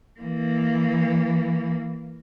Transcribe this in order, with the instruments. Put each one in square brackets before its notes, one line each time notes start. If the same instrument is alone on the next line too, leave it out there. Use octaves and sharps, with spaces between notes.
[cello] E3 A#3